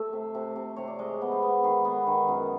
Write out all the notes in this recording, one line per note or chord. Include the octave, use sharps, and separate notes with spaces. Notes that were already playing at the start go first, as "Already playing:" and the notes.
Already playing: A3 E5
C3
C3
C3
C3 C#5
D5
G#3 D#5
B3
C5
B3
D#3 G#4
B3
D#3
F#2